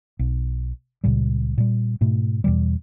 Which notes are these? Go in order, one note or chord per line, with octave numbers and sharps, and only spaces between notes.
B1
C#2 A#2 C#3 G3
A#2 G3
G#2 B2 A3
E2 B2 E3 G3